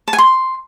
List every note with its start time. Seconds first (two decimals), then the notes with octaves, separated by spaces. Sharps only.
0.08 A5
0.13 G#5
0.18 C6